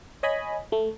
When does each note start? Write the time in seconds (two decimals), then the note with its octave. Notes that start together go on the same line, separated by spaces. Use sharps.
0.23 C#5 D#5 G#5 B5
0.72 A3